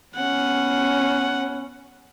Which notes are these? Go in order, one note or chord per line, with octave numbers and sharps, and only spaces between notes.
B3 C#4 F#5